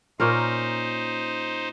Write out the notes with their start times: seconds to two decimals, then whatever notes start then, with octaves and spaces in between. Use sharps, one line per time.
0.20 A#2 C#4 D#4 A#4 C5